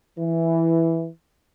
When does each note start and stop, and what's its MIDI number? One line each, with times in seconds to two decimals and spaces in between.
0.18 1.08 52